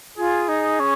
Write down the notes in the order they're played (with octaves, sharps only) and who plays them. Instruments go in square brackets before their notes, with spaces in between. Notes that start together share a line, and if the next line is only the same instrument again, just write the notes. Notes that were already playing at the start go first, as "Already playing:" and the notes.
[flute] F4 [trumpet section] G#4
[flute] D#4
C#4